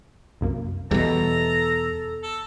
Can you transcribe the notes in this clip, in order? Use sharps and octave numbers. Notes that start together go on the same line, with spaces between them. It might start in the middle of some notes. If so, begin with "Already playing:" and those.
C2 F#2 A#3
E2 B2 G3 A4 A#5
A4